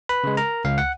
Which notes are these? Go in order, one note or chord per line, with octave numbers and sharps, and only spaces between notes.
B4 B5
C#3 G#3
A#4 A#5
C#2 F5
F#5